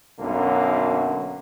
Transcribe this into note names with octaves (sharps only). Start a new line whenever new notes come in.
B1 F#2 D3 A#3